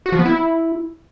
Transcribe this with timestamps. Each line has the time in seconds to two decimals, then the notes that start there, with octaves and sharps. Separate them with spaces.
0.06 F#4
0.12 F3
0.19 B3
0.26 E4